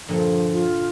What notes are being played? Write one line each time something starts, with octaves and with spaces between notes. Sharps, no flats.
G2 A#2 D3 F3
F4